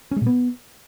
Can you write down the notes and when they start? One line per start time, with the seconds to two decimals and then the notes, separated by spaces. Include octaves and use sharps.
0.11 C#4
0.16 G#3
0.21 A#2
0.26 B3